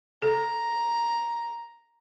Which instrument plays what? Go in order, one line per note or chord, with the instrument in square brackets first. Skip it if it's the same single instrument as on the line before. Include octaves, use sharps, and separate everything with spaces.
[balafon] A4 [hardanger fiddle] A#5